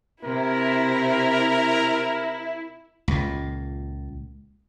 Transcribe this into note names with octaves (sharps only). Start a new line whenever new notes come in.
C3 E4 A#4
C#2 A#2